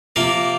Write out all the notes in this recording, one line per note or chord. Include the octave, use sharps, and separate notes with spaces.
C3 F3 A#3 A#4